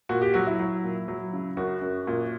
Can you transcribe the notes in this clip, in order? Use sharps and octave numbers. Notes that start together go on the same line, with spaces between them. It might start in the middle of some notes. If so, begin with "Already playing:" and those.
A#2 F#4
G4
F#3 F#4
E4
F#3
A#2
F#3
C#3
F#2 F#4
F#2
A#2